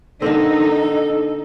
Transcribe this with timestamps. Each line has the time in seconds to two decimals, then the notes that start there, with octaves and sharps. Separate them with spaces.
0.22 D3 A#3 C4 D#4 A4